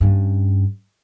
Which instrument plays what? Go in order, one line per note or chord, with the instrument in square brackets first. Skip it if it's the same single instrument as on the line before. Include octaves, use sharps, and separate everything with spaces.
[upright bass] G2 C#4